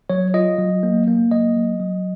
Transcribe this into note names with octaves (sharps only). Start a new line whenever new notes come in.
F#3 C#5
F4 D#5
F#3
A#3
A#3
F#3 D#5
F#3
F#3